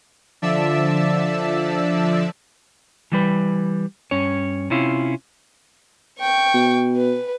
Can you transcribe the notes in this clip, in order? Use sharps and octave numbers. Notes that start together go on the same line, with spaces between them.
D3 F3 D5 E5 A5 E6
E3 G3 B4
G2 C#4 C#5
C3 C#4 E4 F4
G5 C#6
B2
B4